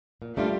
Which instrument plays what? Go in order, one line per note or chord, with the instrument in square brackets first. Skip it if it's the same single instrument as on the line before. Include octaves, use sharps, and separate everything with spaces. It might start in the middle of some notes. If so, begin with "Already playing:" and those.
[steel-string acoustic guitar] A#2
[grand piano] G3 G4 [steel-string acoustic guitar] A3 D4 F4